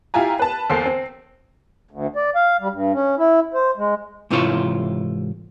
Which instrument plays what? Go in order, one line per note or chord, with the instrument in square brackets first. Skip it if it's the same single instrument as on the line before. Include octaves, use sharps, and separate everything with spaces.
[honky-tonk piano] E4 F4 G4 G#5 A#5
B4 A5
E2 A#3 A4 C5 C7
C4
[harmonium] D2
D5
F5
G3
G2
C#4
E4
C5
G#3
[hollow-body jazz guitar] G#2 C3 E3 E4 F4 C#5